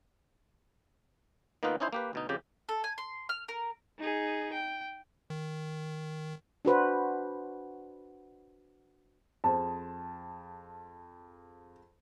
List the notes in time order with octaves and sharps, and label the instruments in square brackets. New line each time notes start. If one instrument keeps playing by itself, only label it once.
[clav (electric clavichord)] D#3 A#3 B3 D#4 F4 B4
C#4 D#4 E4 C5
A#3 G4 B4
D2 B2 D#4
F2 C#3 G4 G5
[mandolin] A4
G#5
C6
F6
A#4
[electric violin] D#4 G#4
G5
[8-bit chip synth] D#3
[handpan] D4 F#4 B4 C5
[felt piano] F2 G#4 C5 [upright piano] A5